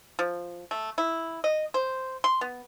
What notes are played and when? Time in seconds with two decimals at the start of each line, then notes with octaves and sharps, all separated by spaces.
0.19 F3
0.71 A3
0.98 E4
1.44 D#5
1.74 C5
2.24 C6
2.41 B3